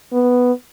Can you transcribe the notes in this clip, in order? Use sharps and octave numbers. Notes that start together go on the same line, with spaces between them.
B3